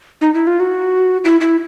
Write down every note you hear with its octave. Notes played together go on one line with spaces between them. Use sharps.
D#4
E4
F4
F#4
E4
E4